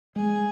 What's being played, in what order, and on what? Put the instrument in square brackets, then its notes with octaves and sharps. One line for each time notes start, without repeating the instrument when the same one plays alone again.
[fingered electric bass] G#3 [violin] G#4